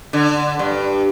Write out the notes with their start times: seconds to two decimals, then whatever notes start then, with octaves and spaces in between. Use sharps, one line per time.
0.13 D3
0.59 G2